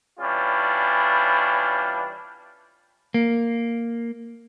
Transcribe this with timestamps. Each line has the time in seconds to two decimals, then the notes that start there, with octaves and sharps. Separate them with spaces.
0.19 E3 G3 C#4 D4 F4
3.14 A#3